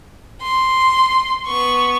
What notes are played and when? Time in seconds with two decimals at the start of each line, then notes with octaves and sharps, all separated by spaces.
0.42 C6
1.46 B3 C#6